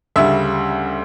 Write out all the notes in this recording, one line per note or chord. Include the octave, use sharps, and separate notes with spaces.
D2 C#3 G3 E5